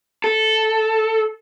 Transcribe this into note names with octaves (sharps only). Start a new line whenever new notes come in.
A4